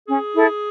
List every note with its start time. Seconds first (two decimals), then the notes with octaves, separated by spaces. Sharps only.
0.07 C#4 G#4
0.34 E4 A4